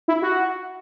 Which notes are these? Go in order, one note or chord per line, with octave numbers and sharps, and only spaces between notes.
E4
F#4